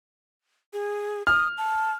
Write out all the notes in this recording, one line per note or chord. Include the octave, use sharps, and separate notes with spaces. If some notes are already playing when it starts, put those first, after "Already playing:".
G#4
D#6 F6
A5